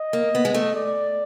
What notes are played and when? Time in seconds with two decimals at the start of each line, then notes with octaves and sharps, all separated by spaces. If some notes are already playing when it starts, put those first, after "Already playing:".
Already playing: D#5
0.13 A#3
0.35 B3
0.45 G#3
0.54 A3
0.75 D5